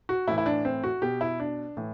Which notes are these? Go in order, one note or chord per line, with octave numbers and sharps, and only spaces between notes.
F#4
A2 E3 E4
E4
D4
C4
F#4
B2 G4
E4
D4
A2 E3